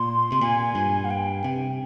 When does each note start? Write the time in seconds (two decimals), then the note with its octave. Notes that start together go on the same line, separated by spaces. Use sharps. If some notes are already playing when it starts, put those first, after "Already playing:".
Already playing: A#2 C6
0.32 C3
0.41 A#2 G#5
0.75 G2
1.04 F5
1.10 G5
1.44 C3